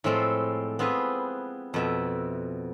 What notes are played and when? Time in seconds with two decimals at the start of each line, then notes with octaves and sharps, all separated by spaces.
0.04 A2 F3 G#3 C4 A4 C6
0.79 B3 C4 F4 G#4 B4
1.74 F2 B2 E5